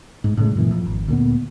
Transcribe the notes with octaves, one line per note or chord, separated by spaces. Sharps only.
G#2
A2 C#3 G#3
F#2 A#2 E3
F2
G#1
D2 A#2 B3